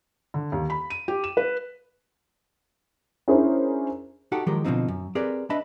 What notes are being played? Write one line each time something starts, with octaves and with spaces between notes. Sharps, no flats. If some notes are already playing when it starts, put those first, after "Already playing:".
D3
D#2
B5
D#7
G4
E7
B4
C#4 D4 E4 G#4 A#4 C5
D#4 F#4 G4 A4 F#5 G5
D#3 F3 F#3 G#3 G4 A#4
B2 D3 F3 C4 D#4
F#2
C4 G4 G#4 A#4 B4 D5
D4 B4 D#5 E5 A5 B5